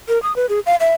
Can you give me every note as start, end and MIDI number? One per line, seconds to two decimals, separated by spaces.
0.08 0.21 70
0.23 0.35 87
0.36 0.46 71
0.49 0.60 68
0.66 0.75 77
0.80 0.94 76